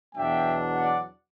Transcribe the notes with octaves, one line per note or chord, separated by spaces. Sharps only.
E2 B2 F#3 B3 D4 E5 G5
D5 F#5